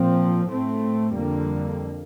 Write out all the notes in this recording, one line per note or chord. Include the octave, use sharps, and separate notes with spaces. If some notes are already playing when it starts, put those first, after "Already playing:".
Already playing: A#2 F3 C4
A2 A3 C4
F2 D3 G3 A#3